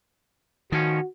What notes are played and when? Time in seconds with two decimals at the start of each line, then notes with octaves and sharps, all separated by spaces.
0.72 A2 D#3 F3 C#4 F#4